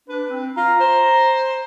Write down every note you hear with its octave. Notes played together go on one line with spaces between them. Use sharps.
D4 B4
C4
F4 A#5
C5